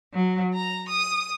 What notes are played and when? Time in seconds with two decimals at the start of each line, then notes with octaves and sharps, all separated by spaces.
0.13 F#3
0.53 A#5
0.89 D#6